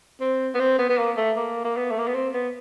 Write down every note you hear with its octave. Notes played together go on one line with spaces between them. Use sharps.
C4
B3
C4
B3
B3
A#3
A3
A#3
A#3
B3
A3
A#3
B3
C4
B3